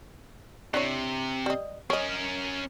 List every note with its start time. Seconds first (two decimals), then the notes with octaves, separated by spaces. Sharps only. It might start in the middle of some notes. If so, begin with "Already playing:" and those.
0.74 C3 D4 E4 C#5
1.46 G3 D#5
1.90 C#4 A#4 C#5 D#5